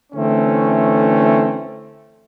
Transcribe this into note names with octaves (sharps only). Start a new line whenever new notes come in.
D3 E3 A3 C4 C#4